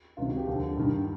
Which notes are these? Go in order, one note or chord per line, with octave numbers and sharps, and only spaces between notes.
C#2 C3 D#3 F4
F#4
G4
D#2 D3 F3
G2 D#3